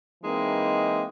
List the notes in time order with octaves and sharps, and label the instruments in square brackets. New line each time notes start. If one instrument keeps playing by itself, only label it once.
[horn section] E3 G#3 A#3 C4 D#4